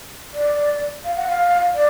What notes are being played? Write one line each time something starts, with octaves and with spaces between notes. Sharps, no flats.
D5
F5
F#5
F5
D5